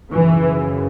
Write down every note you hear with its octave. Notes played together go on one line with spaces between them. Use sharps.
F#2 C#3 E3